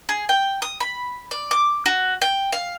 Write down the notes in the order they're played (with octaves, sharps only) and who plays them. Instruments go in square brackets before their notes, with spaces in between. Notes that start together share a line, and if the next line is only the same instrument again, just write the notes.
[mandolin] G#4
G5
D#6
B5
D5
D6
F#4
G5
F5